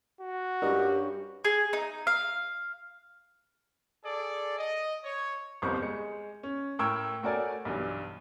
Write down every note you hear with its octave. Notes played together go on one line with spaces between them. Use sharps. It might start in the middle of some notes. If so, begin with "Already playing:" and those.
F#4
G2 C#4 G4 A#4 D5 D#5
G#4
D#4
F5
G#4 A4 D5
D#5
C#5
G1 C2 F2 C5 C#6
G#3 C#7
C#4
A2 A#4 G5 C#6 E6 G#6
A3 F#4 A#4 C#5 D5 G#5
B1 G2 E3